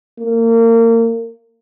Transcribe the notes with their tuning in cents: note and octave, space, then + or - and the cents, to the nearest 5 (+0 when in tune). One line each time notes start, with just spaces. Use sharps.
A#3 -30